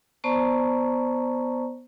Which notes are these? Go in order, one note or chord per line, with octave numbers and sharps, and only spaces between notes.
B3 C5 D5 A5 A#5 C#6